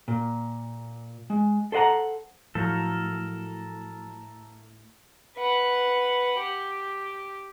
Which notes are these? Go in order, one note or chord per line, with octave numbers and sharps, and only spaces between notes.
A#2
G#3
A4 C5 D#5 F#5 A#5
A2 F3 F#3 A4 A#4
B4 F#5
G4